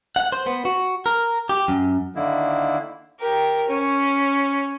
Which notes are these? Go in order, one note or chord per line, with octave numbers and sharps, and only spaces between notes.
F#5
C5
B3
F#4
A#4
G4
F#2
D3 D#3 A#3 E4
G4 A#4
C#4